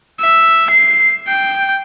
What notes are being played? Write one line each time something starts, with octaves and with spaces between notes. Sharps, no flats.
E5
C7
G5